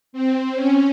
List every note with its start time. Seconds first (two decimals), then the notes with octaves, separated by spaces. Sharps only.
0.13 C4
0.55 C#4